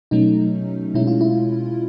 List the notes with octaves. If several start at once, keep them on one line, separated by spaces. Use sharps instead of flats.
B2 F#3 A3 C#4 D#4
B2 G#3 C#4 E4
F4
E4